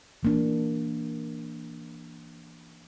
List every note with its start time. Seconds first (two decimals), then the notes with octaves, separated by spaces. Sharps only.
0.23 E3 A#3 D4